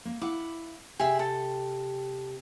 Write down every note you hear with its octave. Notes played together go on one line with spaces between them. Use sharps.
A#3
E4 F5 F#5 D6
C3 G4 G#4 E5
A4